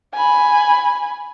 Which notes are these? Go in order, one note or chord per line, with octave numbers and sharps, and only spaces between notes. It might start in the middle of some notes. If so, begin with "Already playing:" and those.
G#5 B5